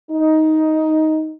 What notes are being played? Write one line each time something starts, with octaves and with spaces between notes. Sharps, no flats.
D#4